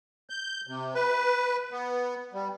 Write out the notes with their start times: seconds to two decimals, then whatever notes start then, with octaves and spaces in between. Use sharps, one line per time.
0.30 G6
0.67 C3
0.95 B4
1.72 B3
2.33 G3